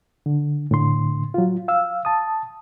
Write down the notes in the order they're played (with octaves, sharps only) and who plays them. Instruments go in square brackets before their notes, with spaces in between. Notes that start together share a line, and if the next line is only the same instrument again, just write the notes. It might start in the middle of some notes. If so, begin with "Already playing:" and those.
[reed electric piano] D3
A2 D3 C6
F#3 F4
F5 E6
A5 D#6